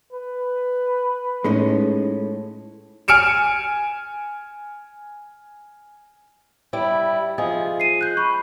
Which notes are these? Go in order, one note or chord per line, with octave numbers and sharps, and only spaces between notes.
B4
A2 G#3 C#4 D#4
G#5 F6 C#7 D7 E7
G3 E4
F3 G#4 D#5
C7 D#7
F#6 G6
B5 C#6